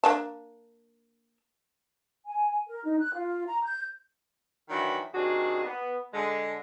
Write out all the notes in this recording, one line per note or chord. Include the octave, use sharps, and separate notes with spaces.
A#3 D4 A5
G#5
A#4
D#4
F#6
F4
A#5
G6
D#3 E3 F#3 D4 B5
C3 D#3 D4 F#4 G#4
B3
D3 G#3